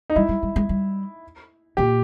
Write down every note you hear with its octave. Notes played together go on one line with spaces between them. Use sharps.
D#4
G3 E4
G3
G3
G#3
G3
A#2 G4